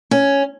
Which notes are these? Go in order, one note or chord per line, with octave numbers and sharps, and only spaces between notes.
C#4